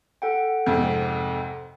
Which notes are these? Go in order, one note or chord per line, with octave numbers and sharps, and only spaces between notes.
A4 F#5 G5
F2 G#2 C3